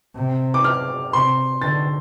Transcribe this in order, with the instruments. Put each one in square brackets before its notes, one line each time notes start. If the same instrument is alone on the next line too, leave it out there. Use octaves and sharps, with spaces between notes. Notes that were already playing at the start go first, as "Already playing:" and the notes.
[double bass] C3
[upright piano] D6
F6
[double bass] C3 [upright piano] C6
[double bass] D3 [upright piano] A6